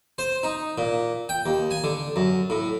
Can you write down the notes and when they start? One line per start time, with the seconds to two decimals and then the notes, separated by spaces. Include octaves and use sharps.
0.18 C5
0.43 D#4
0.78 A#2
1.29 G5
1.46 D#2
1.71 G#5
1.84 D3
2.16 F#2
2.50 A2